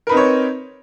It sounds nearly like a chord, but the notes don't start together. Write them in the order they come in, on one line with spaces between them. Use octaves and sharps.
A#4 B4 D#4 C4 C#5